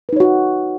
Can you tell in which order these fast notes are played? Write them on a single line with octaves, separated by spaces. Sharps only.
B4 D#4 C#5 F#4